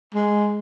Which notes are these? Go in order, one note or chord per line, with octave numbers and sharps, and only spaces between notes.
G#3